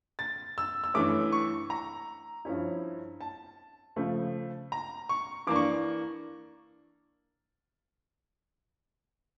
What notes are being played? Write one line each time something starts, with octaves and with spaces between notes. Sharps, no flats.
A6
E6
E6
G2 E3 A3 C#4 D6
C#6
A#5
G2 F3 C#4 E4
A5
C#3 F3 A3
A#5
C#6
E3 A#3 D4 D6
C#6